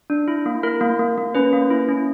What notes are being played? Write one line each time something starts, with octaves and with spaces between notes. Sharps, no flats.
D4
E4
A#3
E4 A#4
A#3
A#3
A#3
C#4 B4
A#3
E4
C#4